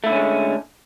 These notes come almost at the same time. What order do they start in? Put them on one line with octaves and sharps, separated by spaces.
A3 E4 D3 C#4 G#3